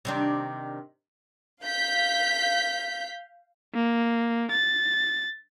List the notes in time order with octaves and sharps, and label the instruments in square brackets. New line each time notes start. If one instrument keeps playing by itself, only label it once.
[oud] C3 D#3 D4
[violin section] F5 G6 B6
[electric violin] A#3
A6